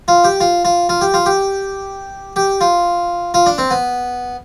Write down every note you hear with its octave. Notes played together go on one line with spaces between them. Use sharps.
F4
G4
F4
F4
F4
G4
F4
G4
G4
F4
F4
D4
C4
B3